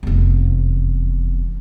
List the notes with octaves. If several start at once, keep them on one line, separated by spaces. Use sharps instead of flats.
F1 E2